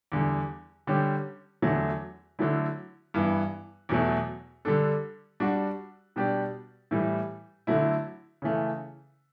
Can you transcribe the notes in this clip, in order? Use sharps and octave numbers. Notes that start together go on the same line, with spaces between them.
E2 D3 G3
D3 G3 C#4 G4
E2 D3 F#3 A3
D3 F#3 A3 E4
G2 E3 B3
E2 B2 F#3 A3
D3 G3 D4 A4
G3 D4 F#4
B2 G3 D4 G4 D5
A2 E3 G3
D3 F#3 A3 E4
C#3 E3 A3